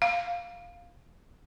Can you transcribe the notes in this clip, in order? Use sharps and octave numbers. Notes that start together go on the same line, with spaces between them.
F5